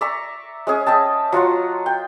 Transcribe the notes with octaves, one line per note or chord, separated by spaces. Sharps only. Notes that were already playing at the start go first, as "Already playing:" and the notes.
D5 E5 A#5 C#6
G#3 C#4 G#4
D#5 E5 G5 A5
F#3 F4 F#5 C6
G5